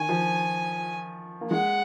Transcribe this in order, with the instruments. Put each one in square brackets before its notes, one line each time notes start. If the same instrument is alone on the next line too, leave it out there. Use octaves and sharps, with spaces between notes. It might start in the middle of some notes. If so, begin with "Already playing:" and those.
Already playing: [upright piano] D#3 [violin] G#5
[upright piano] F3
A#3
[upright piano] G#3 [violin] F#5